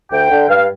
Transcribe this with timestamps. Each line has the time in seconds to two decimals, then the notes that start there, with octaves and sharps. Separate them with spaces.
0.12 D2 G5
0.30 D3
0.49 G2 F5